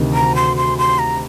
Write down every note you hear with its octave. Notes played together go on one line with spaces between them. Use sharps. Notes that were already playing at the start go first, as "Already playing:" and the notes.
Already playing: D2 C3 D#3
A#5
C6
C6
C6
A#5